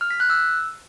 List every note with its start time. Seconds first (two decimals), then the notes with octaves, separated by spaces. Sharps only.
0.01 F6
0.11 B6
0.20 F#6
0.30 E6